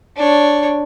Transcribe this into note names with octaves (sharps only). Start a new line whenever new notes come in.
D4 C#5